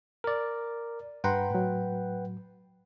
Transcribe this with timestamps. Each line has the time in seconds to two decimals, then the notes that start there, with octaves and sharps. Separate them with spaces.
0.24 A#4 D5
1.24 G2 B4 F#5 G5 A#5 C6
1.51 A2 F#3